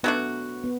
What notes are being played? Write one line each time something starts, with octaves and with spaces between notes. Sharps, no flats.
F#3 A3 B3 D4 F#4
B3